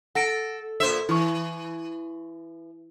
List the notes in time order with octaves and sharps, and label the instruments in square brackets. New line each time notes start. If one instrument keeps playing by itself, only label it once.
[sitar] A4 [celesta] F#5 A#6 D7
[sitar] A#2 C5 E5 [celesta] A4
[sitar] E3 [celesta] E4 C#6